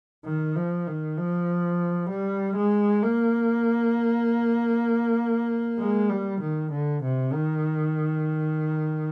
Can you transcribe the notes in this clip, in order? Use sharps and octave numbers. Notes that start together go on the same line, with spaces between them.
D#3
F3
D#3
F3
G3
G#3
A#3
G#3
G3
D#3
D3
C3
D#3